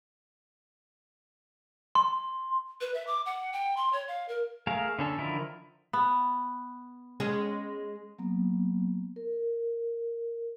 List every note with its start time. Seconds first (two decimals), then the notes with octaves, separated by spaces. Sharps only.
1.95 C6
2.81 B4
2.94 E5
3.07 D6
3.26 F#5
3.53 G5
3.77 C6
3.93 C#5
4.08 F5
4.28 A#4
4.67 A3 G#4 A#4 F5
4.99 D3 C#4 A4
5.18 D3 D#3 F3 E4 A#4
5.93 B3
7.20 G#3 C#4 G#4
8.19 F#3 A#3 B3
9.16 A#4